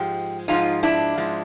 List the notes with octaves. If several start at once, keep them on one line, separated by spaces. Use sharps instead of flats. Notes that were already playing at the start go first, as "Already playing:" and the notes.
Already playing: G#2 F3 G#3 G4
G#2 F3 G#3 D#4 F4
D4 E4
G#2 F3 G#3